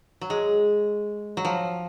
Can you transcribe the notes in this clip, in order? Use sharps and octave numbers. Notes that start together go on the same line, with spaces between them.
F#3
G#3
F#3
F3